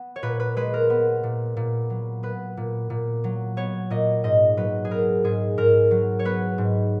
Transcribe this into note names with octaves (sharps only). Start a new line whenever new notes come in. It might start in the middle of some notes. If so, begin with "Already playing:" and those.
Already playing: B3
C#5
A#2 B4
B4
G#3 B4
A#4
B3
A#2
A#2
F#3
B3 B4
A#2
A#2
F#3
B3 C#5
A#2 D#5
G#2 D#5
F#3 B4
G#4
B3 A#4
G#2 G#4
G#2 A#4
F#3
C#5
B3 B4
G#2